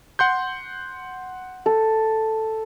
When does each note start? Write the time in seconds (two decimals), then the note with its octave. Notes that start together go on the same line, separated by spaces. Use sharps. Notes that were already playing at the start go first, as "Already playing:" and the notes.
0.19 F#5 C6 G6
1.66 A4